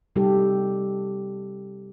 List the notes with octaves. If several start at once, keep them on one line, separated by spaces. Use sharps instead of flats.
C3 G3 D#4 G4 A4